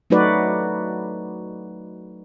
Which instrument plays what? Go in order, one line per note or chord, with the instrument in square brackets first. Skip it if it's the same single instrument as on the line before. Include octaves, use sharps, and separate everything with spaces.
[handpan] F#3 A3 D#4 F#4 B4 D5